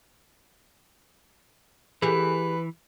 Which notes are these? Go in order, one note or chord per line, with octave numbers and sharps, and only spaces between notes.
E3 G4 G#4 B4